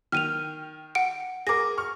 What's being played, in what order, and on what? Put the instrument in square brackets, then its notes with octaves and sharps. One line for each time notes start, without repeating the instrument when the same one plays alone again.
[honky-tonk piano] D#3 G5 [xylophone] F6 D#7 F7
[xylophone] F#5 D7
[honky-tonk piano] G#4 A#4 [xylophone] D6 A#6
[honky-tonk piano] C#6 F6